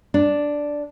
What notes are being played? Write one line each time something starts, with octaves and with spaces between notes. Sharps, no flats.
D4